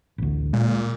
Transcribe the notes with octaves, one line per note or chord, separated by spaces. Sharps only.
A1 D2
A#2 G#3